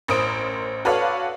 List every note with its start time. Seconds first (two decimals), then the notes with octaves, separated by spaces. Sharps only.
0.08 A1 A#4 C5 D#6 D7
0.85 F#4 A4 B4 C#5 D5 F5